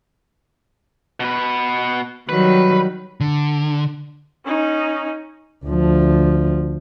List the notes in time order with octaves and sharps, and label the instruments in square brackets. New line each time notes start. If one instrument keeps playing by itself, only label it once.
[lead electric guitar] B2 B4
[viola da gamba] D#3 F#3 G3 [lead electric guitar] B4
[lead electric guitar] D3
[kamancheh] C#4 D#4
[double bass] D2 F3